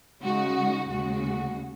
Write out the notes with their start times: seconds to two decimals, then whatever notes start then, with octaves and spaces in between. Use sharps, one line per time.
0.22 C#3 G#3 D#4 F#4
0.88 D#2 C#3 G#3 F#4